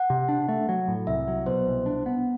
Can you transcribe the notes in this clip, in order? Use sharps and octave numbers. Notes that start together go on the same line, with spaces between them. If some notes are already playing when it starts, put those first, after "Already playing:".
Already playing: F#5
C3
D4
A3
F#3
A2
C2 E5
F#3
B2 C5
C2
D4
B3